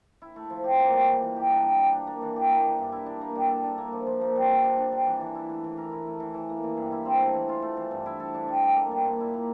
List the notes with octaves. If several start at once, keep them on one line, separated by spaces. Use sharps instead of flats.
E4
A3
F3
G4
A#3
G3
E3
E3
G4
D4
G3
G3
D4
A#3
E3
G4
A#3
E3
G2
E4
D4
A#3
G3
A4
D4
A#3
F3
F3
A#3
G3
C3
D4
D4
G3
E3
E3
E4
A3
E3
A#4
E4
A3
E3
E3
A#3
E3
G2
E4
C4
A3
E3
F4
A3
E3
G2
E4
A4
D4
G3
G3
A#3
G3
A#2
E4
A#3